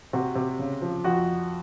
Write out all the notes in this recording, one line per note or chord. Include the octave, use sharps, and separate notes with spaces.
C3 F#4
C3
C#3
F3
F2 F#4